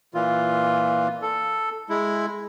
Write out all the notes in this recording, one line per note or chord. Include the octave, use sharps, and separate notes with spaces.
A#2 E3 F4
A4
G#3 E4